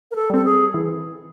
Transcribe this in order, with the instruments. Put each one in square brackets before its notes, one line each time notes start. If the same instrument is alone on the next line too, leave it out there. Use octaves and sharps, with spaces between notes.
[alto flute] A#4
A4
[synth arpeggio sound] G3 C4 [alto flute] A4
[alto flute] G#4
[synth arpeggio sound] E3